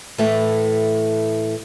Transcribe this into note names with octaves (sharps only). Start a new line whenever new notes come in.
A2 E3 A3